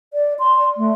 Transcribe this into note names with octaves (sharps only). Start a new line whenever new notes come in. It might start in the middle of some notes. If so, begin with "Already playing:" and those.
D5
C6
A3